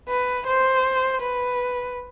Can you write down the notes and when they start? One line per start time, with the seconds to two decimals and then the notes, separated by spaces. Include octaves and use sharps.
0.08 B4
0.47 C5
1.22 B4